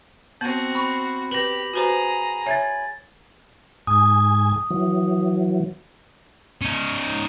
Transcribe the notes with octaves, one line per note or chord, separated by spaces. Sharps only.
B3 C4 F#4 G6
B5 C#6
G4 B4 A#6 F#7
F#4 G#4 B4 C5 A#5
C#5 E5 G#5 G#6 A6
G#2 G#5 D#6
E3 F#3
C#4 D#4